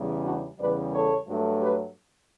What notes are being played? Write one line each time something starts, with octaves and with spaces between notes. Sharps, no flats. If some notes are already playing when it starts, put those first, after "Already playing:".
Already playing: E2 C#3 G3
D4 F#4
E2 C#3 G3 B4 D5
A4 C#5
G2 F#3 A3
G4 B4